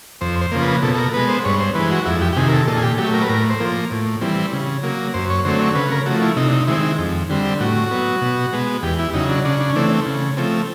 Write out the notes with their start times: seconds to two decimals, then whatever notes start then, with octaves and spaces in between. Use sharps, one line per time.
0.21 F2 C5
0.41 C5
0.52 C#3 F3 A#3
0.62 B4
0.83 B2 A4
0.94 A4
0.98 A#4
1.13 G#3 B3 B4
1.29 C5
1.45 G2 C#5
1.60 C5
1.75 E3 G#3 B4
1.91 F#4
2.05 F2 E4
2.21 G4
2.33 G4
2.37 C3 D#3 G#4
2.48 A#4
2.53 A4
2.67 A#2 A4
2.77 G#4
2.82 G4
2.98 F#3 A3 G4
3.14 A#4
3.22 B4
3.29 A2 A#4
3.50 C5
3.60 F3 A#3
3.91 A2
4.21 E3 G3 C4
4.53 C#3
4.83 F#3 A#3
5.14 F#2 C5
5.30 C#5
5.45 D3 F#3 A3 C4 C5
5.61 C#5
5.75 C#3 B4
5.91 A#4
6.06 F3 A3 F#4
6.22 E4
6.36 C3 D#4
6.48 D4
6.53 D#4
6.67 D#3 G#3 C4 E4
6.99 F2
7.30 D3 G3 C4
7.60 A2 F#4
7.91 F#3 B3
8.21 B2
8.53 G#3 B3
8.83 E2 G4
8.99 E4
9.13 C#3 F#3 D#4
9.29 D4
9.45 C#3 D4
9.61 D4
9.70 C#4
9.76 E3 A3 C4 D4
10.06 C#3
10.37 F3 A3 C4